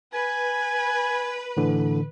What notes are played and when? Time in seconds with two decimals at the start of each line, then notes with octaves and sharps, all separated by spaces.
0.14 B4 G#5
1.57 A2 D3 E3